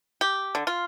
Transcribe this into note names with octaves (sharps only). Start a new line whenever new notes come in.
G4
D3
F4